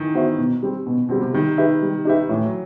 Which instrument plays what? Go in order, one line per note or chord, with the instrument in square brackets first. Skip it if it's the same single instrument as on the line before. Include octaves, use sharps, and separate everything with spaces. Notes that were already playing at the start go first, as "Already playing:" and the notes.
Already playing: [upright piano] D#3 E3
[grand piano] B3 F#4 C5 E5
B2
G3 C4
B2
[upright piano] B2 [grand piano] G3 C4
[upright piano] C3
[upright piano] D#3 [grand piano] G3
[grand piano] D#4 G4 B4 E5
G3
D#4 G4 B4 E5
[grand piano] A2 [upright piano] E3
[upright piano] F#3